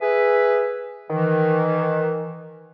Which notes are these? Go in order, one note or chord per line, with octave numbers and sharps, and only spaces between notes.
G#4 B4 E5
D#3 E3